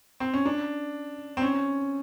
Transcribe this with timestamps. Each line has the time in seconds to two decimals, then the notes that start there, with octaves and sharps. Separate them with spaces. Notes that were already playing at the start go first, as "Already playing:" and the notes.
0.20 C4
0.34 C#4
0.46 D4
1.37 C4
1.42 C#4